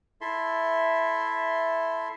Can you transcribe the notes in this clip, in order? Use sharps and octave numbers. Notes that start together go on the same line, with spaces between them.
E4 A4 E5 C6